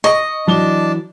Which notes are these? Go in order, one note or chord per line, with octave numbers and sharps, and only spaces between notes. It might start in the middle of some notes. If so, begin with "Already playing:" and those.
D#5 C#6
E3 F#3 D4 A5 G7